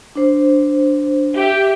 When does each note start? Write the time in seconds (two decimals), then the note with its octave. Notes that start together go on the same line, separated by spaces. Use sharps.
0.15 D4 C5
1.36 G4 E5